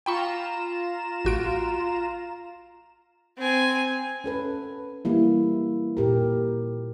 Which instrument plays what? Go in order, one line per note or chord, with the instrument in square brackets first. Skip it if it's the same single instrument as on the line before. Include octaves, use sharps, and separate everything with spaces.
[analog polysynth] F4 A#5 E7 [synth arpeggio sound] G5 B5 C#6
[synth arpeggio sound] A1 F#4 D7
[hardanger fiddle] C4 G#5
[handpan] C#4 A4 B4
E3 G3 A#3 E4
A#2 G4 A#4